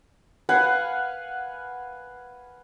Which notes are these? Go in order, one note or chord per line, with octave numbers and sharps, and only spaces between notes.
B4 F5 F#5 G#5